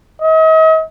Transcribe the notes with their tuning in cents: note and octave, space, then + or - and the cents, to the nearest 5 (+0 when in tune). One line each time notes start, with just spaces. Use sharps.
D#5 +40